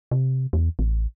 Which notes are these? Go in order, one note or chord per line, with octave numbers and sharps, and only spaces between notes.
C3
E2
A1